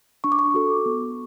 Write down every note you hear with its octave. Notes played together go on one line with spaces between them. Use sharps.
D4 C#6
D6
C#6
F#4 A4
B3